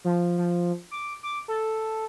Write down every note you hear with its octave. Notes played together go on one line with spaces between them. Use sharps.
F3
F3
D6
D6
A4